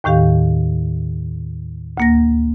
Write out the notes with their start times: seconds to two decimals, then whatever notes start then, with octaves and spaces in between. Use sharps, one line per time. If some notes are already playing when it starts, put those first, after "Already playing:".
0.04 D#2 A2 D#3 G4 F5
1.97 D2 A#3 A#6